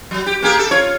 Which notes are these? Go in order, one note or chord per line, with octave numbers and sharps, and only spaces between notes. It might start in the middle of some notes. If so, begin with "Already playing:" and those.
F#3
G4
A#3 G4 G#4
A4
F4 C#5